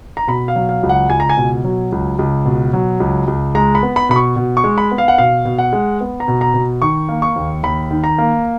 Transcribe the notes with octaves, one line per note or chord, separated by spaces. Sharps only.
A#5
B2 B5
F5
F#3
F5
C#2
F#5
C#2 G#5
A#5
G#5
B2
F#3
C#2
C#2
B2
F#3
C#2
C#2
G#3 A#5
B5
B3
B5
B2 B5
C#6
B2
C#6
G#3
B5
B3
F5
F#5
B2 F5
B2
F#5
G#3
B3
A#5
B2
A#5
B2
D#3 C#6
A#3
C#6
D#2
D#2 B5
D#3
A#5
A#3